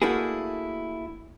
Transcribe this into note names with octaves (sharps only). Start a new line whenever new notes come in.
A3 A#3 D4 E4 F#4 G#4